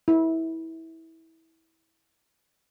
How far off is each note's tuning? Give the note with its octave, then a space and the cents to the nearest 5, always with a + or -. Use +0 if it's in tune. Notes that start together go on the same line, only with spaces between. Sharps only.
E4 -20